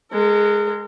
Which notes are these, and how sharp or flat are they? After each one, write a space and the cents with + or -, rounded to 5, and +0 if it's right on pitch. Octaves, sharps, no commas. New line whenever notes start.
G#3 +0 A#4 -40